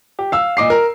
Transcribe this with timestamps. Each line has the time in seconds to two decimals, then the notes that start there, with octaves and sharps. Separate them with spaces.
0.19 G4
0.32 F5 E6
0.57 A#2 D#5 D6 C7
0.70 A#4